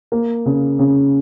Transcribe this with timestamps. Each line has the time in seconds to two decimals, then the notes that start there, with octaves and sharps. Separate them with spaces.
0.12 A#3
0.46 C#3
0.79 C#3